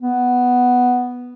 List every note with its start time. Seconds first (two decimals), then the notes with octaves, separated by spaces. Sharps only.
0.01 B3